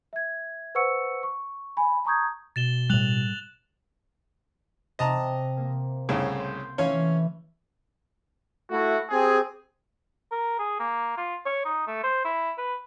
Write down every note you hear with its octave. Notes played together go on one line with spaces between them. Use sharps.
E5 G#6
B4 C5 F#5 C#6 E6 C#7
C#6
G#5 B5
A5 A#5 C#6 D#6 G6 G#6
B2 A6 E7 G7
A2 G3 F#6 F7 F#7
C3 D#5 A5 A#5
A#3
C2 A2 C#3
C6 G6
E3 A3 C#4 C#5 F5
A3 E4 F#4
C4 G4 G#4
A#4
G#4
A#3
F4
C#5
D#4
A3
C5
E4
B4